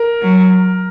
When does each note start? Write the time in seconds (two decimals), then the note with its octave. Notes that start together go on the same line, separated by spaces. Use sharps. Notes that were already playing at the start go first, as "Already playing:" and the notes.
Already playing: A#4
0.22 F#3